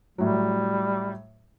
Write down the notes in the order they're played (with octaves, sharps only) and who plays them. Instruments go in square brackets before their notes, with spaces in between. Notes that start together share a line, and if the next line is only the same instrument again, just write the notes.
[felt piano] A2 F#3 [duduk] G3